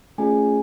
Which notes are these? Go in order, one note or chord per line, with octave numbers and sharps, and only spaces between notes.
A3 C#4 F4 G#4 G#5